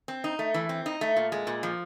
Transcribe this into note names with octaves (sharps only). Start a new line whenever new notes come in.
C4
D#4
A3
E3
C4
D#4
A3
A#2
G#3
A#2
F3